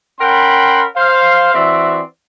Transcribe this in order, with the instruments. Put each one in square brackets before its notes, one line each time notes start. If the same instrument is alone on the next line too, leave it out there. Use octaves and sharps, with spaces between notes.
[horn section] C#4 A#4 F#5 G5 B5 C6
C5 F5
E3 C4 F#4 D5 E5